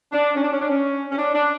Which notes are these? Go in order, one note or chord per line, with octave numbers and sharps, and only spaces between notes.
D4
C#4
D4
C#4
D4
C#4
C#4
D4
D4